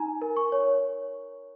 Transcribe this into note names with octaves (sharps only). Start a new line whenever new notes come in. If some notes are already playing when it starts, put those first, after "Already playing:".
Already playing: D#4 G#5 A#5
A#4
C#6
C#5